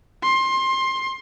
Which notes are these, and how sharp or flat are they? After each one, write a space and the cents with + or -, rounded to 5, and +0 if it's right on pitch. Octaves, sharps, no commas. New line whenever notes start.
C6 +25